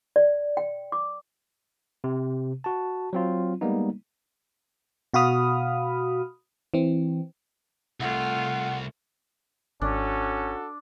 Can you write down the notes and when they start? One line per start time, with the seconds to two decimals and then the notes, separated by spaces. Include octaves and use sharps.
0.16 D5
0.57 G5
0.92 D6
2.04 C3
2.64 F#4 A5
3.13 F#3 C4 F4
3.61 G3 G#3 A#3 B3 D#4
5.14 B2 F#4 F5 B5 D#6 F6
6.74 E3 C4
8.00 C2 A3 F4 F#5
9.81 G#1 C#4 D4 F#4 A4